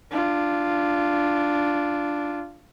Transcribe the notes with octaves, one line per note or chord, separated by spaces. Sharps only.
D4 F4